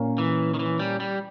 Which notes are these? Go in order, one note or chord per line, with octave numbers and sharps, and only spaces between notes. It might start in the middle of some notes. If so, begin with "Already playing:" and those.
Already playing: A#2 A#3 C#4
E3
D#3
E3
G3
G3